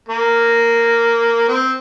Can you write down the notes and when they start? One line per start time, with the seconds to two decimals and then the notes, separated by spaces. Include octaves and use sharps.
0.09 A#3
1.48 C4